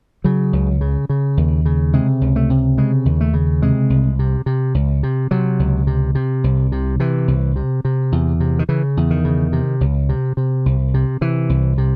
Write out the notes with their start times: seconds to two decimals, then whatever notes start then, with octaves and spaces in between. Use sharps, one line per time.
0.24 C#3 F#3
0.53 C#2
0.81 C#3
1.09 C#3
1.37 D#2
1.65 C#3
1.93 C3 G#3
2.21 C#2
2.36 A3
2.50 C3
2.77 C#3 G#3
3.05 D#2
3.21 A3
3.34 C#3
3.62 C3 G#3
3.90 C2
4.19 C3
4.46 C3
4.74 C#2
5.03 C3
5.31 C3 F#3
5.59 C#2
5.87 C3
6.15 C3
6.44 C2
6.72 C3
7.00 C3 E3
7.28 C2
7.56 C3
7.85 C3
8.12 E2
8.40 C3
8.59 D#3
8.69 C#3 E3
8.97 E2
9.11 D#3
9.25 C#3
9.53 C3
9.81 C#2
10.09 C3
10.37 C3
10.66 C2
10.94 C3
11.21 C3 E3
11.49 C2
11.78 C3